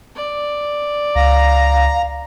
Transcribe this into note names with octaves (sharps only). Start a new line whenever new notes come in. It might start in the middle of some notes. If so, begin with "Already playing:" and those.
D5
C#2 F5 A#5